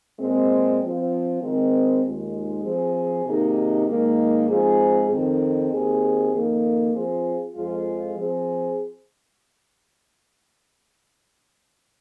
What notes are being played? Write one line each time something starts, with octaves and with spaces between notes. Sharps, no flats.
A#2 G#3 C4
F3 C4 F4
D#3 G#3 C4
D#2 D#3 G#3 F4
F3 C4 G#4
C3 D#3 A#3 D#4 G#4
G#2 D#3 A#3
G#2 F3 C4 G#4
F2 D#3 C4
D#2 D#3 C4 G#4
F2 D#3 A#3
F3 C4 F4 G#4
F2 F3 G#3 F4 G#4
F3 C4 G#4